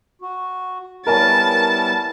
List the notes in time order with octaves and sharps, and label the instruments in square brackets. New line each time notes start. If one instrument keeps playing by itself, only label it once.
[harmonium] F#4
[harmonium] G3 B3 E4 [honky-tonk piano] A#4 C#5 G#5 [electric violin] A5